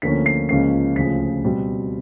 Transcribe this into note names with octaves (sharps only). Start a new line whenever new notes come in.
D2 D3 F3 A#3 C#4 B6
C7
C#2 C#3 F3 A#3 C#4 C7
D2 C#3 F3 B6
B2 G3 C4